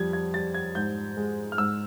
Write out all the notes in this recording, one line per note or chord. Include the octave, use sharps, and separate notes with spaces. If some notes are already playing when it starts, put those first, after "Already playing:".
Already playing: F2 G3 G#6
G#6
G3 A6
G#6
G#2 G6
G#3
F6
G#2 E6